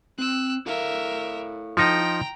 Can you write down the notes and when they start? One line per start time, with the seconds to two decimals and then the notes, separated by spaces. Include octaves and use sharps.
0.19 C4 E6 F#6
0.66 E4 A4 A#4 E5 F5
1.77 F3 D#4 G5 A#5